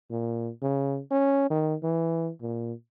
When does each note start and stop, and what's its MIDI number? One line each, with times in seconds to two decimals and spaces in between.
0.11 0.50 46
0.62 1.00 49
1.11 1.47 61
1.50 1.75 51
1.83 2.31 52
2.42 2.73 46